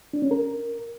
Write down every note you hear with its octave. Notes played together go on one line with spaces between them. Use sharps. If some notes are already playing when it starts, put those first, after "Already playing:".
D4
C#4
A#4